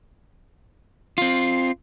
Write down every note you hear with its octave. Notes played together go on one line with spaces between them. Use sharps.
C4 F4